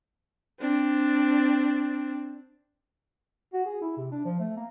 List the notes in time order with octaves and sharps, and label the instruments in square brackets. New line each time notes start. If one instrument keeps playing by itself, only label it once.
[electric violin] C4 D4
[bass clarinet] F#4
G#4
E4
C3
D4
F3
A3
A#3